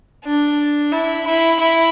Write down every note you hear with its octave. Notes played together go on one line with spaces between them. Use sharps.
D4
E4
E4
E4